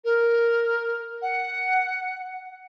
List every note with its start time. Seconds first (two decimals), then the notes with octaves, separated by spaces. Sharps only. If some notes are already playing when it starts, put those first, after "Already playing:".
0.05 A#4
1.22 F#5